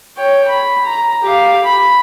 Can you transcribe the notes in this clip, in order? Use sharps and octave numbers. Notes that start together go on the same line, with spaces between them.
C#5 G5
B5
A#5
G4 F5
B5